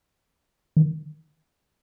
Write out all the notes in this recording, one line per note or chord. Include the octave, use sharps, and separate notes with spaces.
D#3